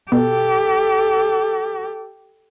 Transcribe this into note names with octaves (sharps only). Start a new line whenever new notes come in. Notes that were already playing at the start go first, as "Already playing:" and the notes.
B2 G4 A4